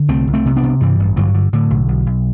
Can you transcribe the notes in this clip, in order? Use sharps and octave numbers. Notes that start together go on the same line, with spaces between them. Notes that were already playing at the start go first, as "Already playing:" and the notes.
Already playing: D3
C2 A3 C4
C2
A3 C4
C3
B3 D4
C3
G2 E3 G3
A1
G2 D3 F#3
D3
A2 D3
B1
B1
B1